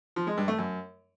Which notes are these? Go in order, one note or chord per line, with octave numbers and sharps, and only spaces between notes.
F3
G#3
G2
A3
F#2